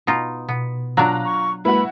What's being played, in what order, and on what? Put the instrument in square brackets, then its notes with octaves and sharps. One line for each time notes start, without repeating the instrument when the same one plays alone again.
[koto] B2 D#4 F4
[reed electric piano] B2 [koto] B3
[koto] F#3 D4 [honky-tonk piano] F4 A#5 F#6
[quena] C#6
[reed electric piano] G#3 A#3 B4 [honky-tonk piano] E4 F#4 [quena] B5